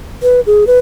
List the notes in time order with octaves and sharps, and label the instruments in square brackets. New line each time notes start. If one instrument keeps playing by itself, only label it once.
[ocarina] B4
G#4
B4